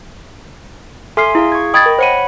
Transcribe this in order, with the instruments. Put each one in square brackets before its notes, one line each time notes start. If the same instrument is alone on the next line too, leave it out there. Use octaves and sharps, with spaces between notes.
[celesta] A4 F6 C7 [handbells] E5 G#5 C6
[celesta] E4 [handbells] G#4 F5
[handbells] C#6 G#6
[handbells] D#5 G5 B5 [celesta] D#6 G#6 A6
[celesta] A#4
[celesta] C5 D#7 [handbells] C#5 F#5 B5